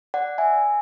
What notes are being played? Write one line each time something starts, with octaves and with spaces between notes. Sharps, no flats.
D5 F#5
E5 G#5